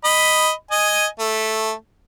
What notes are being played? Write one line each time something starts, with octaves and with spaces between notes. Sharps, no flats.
D#5 B5
D#5 G#5
A3